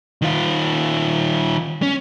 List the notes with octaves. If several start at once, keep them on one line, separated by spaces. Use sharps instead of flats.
D#3 F4
C#4